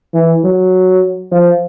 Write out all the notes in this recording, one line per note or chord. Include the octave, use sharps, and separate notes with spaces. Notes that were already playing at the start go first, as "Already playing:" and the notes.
E3
F#3
F3